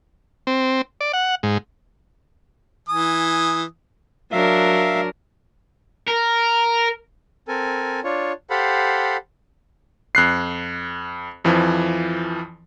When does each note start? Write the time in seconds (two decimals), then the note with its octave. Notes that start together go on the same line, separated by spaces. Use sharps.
0.47 C4
1.01 D5
1.13 F#5
1.43 G#2
2.89 E3 G#5 D#6
4.32 F#3 D4 A#4 E5 F5
6.08 A#4
7.48 C4 A4 A#4 G#5
8.04 D4 F4 C#5
8.50 G4 A4 C5 F5 F#5 B5
10.15 F2 F#6 C7
11.45 F2 E3 F3